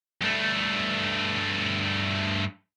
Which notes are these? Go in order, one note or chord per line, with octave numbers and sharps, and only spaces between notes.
G2 A3